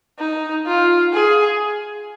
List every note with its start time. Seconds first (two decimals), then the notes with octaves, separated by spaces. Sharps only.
0.19 D#4
0.67 F4
1.14 G#4